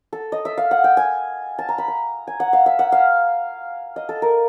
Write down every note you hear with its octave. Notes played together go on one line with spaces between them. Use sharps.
A4
D#5
E5
F5
F#5
G5
G#5
A5
A#5
B5
A#5
G#5
F#5
F5
E5
F#5
F5
D#5
A4
A#4